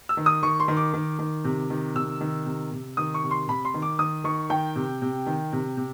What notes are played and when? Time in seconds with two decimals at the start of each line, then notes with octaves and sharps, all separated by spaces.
0.09 E6
0.17 D#3
0.26 D#6
0.43 D#3 C#6
0.60 C6
0.68 D#3
0.77 D6
0.94 D#3
1.19 D#3
1.44 C3
1.70 D#3
1.95 C3 E6
2.21 D#3
2.46 C3
2.72 C3
2.97 D#3 D#6
3.14 C#6
3.23 C3
3.31 C6
3.48 C3 B5
3.65 C6
3.74 D#3
3.82 D6
3.99 D#3 D#6
4.24 D#3 C#6
4.50 D#3 G5
4.76 C3
5.02 C3
5.26 D#3
5.53 C3
5.77 C3